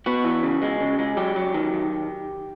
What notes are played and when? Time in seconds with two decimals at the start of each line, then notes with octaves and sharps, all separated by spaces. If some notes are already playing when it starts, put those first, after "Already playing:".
0.06 B3 F#4
0.24 E3
0.43 C#3
0.62 G#3
0.81 C#3
0.99 G#3
1.17 F#3 G4
1.36 F#3
1.54 D#3
1.74 D#3